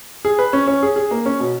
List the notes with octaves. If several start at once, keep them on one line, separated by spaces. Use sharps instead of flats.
G#4
B4
C#4
C#4
G#4
G#4
A#3
C#4
B2